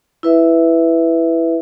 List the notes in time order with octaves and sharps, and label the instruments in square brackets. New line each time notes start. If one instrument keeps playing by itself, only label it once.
[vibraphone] E4 B4 E5